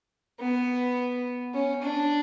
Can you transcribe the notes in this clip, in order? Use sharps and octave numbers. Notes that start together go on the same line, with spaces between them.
B3
C#4
D4